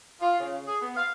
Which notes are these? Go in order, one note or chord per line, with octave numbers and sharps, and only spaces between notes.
F4
C#3
G#4
B3
F5